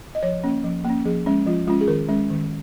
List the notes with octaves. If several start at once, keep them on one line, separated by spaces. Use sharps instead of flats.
D#5
F3 C#5
A#3 C#4
F3
A#3 C#4
F3 G#4
G#3 C#4
F3 F4
G#3 C#4 F4
G#4
D#3 A#4
G#3 C#4
D#3